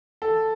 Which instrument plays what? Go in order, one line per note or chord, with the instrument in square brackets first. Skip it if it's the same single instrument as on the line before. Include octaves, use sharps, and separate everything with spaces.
[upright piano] A4